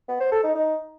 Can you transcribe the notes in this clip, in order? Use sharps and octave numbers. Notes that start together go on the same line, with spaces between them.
B3
C5
A4
D#4
D#4